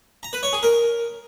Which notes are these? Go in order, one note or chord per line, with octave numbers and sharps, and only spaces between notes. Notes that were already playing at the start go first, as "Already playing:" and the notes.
A#5
B4
C#5
G#4
A#4